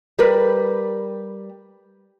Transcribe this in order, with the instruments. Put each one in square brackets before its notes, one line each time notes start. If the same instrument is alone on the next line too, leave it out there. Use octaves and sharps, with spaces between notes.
[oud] G3 A#4 B4